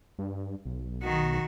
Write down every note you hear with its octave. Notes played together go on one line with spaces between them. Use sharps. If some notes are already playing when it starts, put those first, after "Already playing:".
G2
B1
D#3 F#4